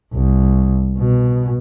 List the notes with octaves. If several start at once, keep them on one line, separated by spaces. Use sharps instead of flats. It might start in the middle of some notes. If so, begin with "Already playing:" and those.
C2
B2